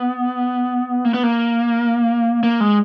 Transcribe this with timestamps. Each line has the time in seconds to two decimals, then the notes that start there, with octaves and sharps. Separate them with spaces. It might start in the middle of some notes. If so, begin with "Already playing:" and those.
Already playing: B3
1.05 A#3
1.14 B3
1.23 A#3
2.43 A#3
2.60 G#3